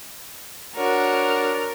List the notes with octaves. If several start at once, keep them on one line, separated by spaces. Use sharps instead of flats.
D4 F#4 A#4 C#5